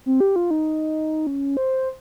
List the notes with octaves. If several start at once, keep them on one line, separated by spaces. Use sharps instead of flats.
C4
G4
F4
D#4
C#4
C5